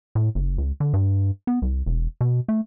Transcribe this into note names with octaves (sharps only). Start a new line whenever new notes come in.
A2
F#1
C#2
D3
G2
B3
C2
E1
B2
A3